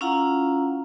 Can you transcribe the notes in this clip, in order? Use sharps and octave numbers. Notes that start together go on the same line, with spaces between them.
C#4 E4 F4 F5 F#5 A#5